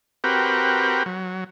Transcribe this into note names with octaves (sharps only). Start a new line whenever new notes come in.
C4 F#4 G4 A#4 B4
F#3